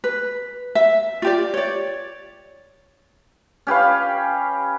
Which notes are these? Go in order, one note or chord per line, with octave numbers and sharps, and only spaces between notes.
B4
E5
F4 G4 D5
C#5 D5
C#4 G4 B4 F5